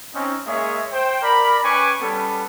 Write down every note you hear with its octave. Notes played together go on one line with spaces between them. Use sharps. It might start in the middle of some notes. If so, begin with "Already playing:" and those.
C4 C#4 D#4
G#3 A#3 G#4 C#5 E5
C5 G5
A#4 D5 B5
C#4 B4 G5 G#5 C#6 D6
G3 B3 C#4 A4